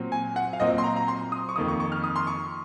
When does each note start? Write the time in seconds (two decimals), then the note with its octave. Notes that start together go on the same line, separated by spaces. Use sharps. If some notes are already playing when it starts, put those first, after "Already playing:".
Already playing: A#2 F#3 C4
0.12 G#5
0.36 F#5
0.53 F5
0.60 A#2 F#3 C4 D#5
0.78 C6
0.84 A#5
0.96 A#5
1.08 C6
1.32 D#6
1.49 C#6
1.56 F2 D#3 A#3 D#6
1.68 C#6
1.80 C#6
1.92 F6
2.04 D#6
2.16 C6
2.27 C#6